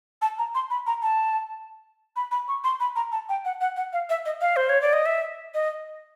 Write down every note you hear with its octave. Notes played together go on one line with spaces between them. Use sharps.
A5
A#5
C6
B5
A#5
A5
B5
B5
C#6
C6
B5
A#5
A5
G5
F#5
F#5
F#5
F5
E5
D#5
F5
C5
C#5
D5
D#5
E5
D#5